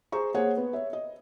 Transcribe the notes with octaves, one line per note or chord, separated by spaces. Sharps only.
G#4 C5 A#5 C#6
A#3 G#4 C5 C#5 F#5 G#5
B3
C#5 E5
D#5